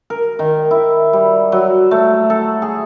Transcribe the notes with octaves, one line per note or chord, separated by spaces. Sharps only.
A#4
D#3
E4
G3
F#3
A3
A4
G#4